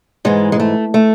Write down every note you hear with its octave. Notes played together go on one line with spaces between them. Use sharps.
G#2 E3 G#3
G#3
A3
A3